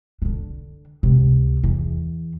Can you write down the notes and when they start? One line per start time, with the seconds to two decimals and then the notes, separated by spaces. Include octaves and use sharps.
0.22 D3 D4
1.03 C#2 C3
1.64 E2